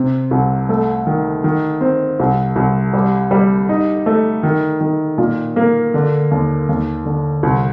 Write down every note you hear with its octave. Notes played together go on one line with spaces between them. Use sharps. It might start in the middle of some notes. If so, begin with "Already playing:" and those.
Already playing: C3
C2
A3
D#3
D#3
C4
C2
C2
G3
G3
D#4
A3
D#3
D#3
A#2
A#3
D3
D#2
D#2
D3
C2